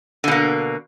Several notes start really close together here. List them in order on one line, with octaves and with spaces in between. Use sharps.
D3 B2 A#3